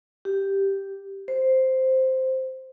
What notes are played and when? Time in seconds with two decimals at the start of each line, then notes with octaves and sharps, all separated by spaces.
0.25 G4
1.28 C5